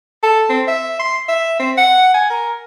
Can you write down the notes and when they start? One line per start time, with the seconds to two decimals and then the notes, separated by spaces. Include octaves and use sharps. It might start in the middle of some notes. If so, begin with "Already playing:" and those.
0.23 A4
0.49 C4
0.67 E5
0.99 C6
1.29 E5
1.59 C4
1.77 F#5
2.14 G#5
2.30 A#4